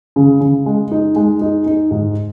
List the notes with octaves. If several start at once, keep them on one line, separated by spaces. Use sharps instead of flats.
C#3
C#3
G#3
D#4
G#3
D#4
D#4
G#2